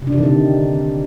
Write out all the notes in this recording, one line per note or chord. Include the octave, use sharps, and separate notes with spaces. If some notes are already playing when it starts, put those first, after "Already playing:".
C3
D4
C3
D#3
D3